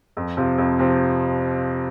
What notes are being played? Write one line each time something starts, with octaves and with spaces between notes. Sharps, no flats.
F2
C3 F3
F2
C3 F3